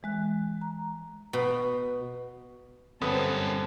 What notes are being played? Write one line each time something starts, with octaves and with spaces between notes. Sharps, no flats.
E3 G#3 F#6
A#5
B2
G1 F#2 G3 C4 C#4 A4 B4 D#6